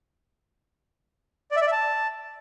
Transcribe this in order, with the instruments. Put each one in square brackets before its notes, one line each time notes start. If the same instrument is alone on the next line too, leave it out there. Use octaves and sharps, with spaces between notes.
[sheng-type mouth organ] D5
E5
D5
E5
A5